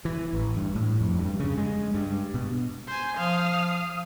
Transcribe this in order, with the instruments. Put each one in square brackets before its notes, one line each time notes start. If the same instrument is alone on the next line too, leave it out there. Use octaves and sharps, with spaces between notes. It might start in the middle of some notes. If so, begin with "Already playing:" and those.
[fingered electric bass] E3
A1
G2
A2
F2
G2
C#3
G#3
G2
B2
[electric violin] C5 G#5
[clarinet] F3 [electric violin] F5 D#6